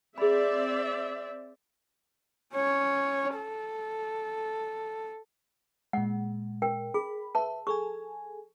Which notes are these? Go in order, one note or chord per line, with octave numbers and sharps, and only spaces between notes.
C4 G#4 D5 E5 B5
C#4 C#5
A4
A#2 G#3 F#5
A#4 G5
G#4 B5
B4 E5 A5
G#4 A4 G#5 C#6